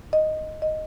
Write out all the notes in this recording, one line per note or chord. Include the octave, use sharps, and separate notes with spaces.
D#5
D#5